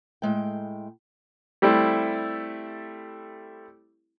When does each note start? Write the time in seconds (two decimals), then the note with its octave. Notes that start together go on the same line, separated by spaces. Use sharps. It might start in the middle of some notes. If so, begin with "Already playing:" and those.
0.22 A2 G#3 G5
1.62 G3 A3 C4 E4